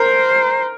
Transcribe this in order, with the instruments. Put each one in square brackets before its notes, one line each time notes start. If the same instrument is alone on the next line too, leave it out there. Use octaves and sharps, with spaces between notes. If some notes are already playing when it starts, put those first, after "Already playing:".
Already playing: [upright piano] A#4 [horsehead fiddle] C5